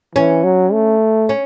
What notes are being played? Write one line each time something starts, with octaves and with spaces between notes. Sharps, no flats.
E3 C#4
F#3
A3
C#4